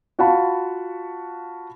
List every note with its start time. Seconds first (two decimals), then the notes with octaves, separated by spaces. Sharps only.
0.19 F4 F#4 F5 F#5 A5 B5